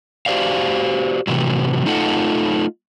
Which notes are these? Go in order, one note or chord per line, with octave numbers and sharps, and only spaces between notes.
F#4 G4 C5 D5 F5
A2 C3 E3 F#3
A3 D#4 F4 A4 D#5 F#5